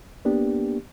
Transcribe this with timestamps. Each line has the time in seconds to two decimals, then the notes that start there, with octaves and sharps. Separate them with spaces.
0.25 A#3 B3 D4 G4